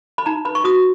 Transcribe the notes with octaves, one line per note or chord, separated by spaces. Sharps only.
B5
D#4 A#5
B4 B5
C#6
F#4 D#6